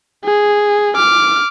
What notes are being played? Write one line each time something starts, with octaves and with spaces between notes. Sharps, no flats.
G#4
D6 F6